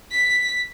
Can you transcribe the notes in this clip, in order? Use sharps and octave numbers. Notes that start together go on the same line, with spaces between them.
B6